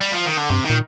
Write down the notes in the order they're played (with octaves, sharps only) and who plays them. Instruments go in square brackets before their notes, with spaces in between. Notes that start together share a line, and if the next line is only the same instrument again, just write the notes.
[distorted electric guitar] G3
F3
D#3
D3
[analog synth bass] G2 [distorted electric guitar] C3
[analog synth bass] A#2 [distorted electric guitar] D#3